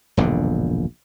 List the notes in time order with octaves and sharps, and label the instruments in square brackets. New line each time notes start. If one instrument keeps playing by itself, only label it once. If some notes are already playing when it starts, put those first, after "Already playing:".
[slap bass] E1 A#1 G2 D3